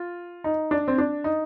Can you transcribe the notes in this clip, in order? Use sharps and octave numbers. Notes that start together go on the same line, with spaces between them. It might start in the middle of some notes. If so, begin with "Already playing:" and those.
Already playing: F4
D#4
D4
C4
D4
D#4